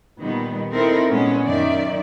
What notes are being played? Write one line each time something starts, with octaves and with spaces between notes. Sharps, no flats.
A#2 D#3 G3 B3
C4 D#4 E4 A4 A#4
A#2 G#3 B3 C#4
F#2 D#3 D#4 D5 E5